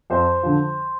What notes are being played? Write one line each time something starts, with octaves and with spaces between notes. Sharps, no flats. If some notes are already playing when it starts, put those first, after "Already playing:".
F2 C5
D3 F3